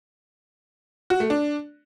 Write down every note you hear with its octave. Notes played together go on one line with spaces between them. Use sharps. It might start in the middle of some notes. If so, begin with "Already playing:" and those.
F#4
A3
D4